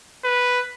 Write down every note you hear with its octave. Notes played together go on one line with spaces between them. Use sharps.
B4